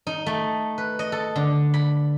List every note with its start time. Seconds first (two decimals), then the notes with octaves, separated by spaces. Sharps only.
0.07 D#4
0.26 A3
0.78 B4
0.99 D#5
1.12 A4
1.36 D3
1.74 B5